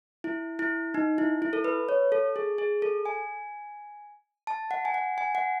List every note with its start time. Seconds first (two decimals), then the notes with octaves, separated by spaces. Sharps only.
0.24 E4
0.59 E4
0.94 D#4
1.18 E4
1.42 E4
1.53 A4
1.64 B4
1.89 C#5
2.12 A4
2.36 G#4
2.58 G#4
2.82 A4
3.05 G#5
4.47 A5
4.71 F#5
4.85 G#5
4.94 F#5
5.18 G#5
5.35 F#5